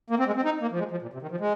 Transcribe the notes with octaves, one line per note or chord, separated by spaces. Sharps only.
A#3
C4
G#3
C4
D#4
A#3
F3
G#3
F3
A#2
C3
D#3
F3
G#3